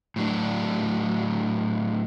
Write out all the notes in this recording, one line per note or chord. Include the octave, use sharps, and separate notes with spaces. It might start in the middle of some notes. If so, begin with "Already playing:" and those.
A2 F#3 D4